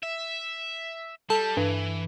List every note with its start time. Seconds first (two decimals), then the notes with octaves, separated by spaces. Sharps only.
0.03 E5
1.30 G3 A4 A5
1.57 G2 E3